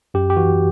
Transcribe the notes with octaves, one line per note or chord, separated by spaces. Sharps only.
F#2 G4
G4
E3 F#4